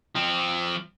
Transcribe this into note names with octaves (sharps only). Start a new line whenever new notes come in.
F3 C4